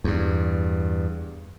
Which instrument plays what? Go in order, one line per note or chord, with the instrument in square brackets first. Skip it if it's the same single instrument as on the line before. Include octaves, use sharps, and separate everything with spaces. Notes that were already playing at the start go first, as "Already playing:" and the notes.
[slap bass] E2 G2